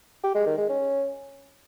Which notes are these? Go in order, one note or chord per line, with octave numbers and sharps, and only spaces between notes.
G4
G#3
D#3
G#3
C#4